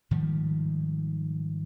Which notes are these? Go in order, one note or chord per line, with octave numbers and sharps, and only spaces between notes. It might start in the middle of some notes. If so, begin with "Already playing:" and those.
G#2 D#3 F3 G3